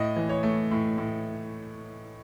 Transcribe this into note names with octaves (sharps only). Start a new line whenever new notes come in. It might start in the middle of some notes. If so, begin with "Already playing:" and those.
Already playing: A2 D#5
E3
C#5
A3
A2
A2